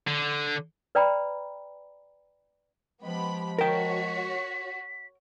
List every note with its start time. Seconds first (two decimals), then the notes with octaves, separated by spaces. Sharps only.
0.07 D3
0.95 B4 D5 G5 A#5 B5
3.02 F3 G#3 B3 G4 B5
3.58 F#4 A#4 C#5 G5 B6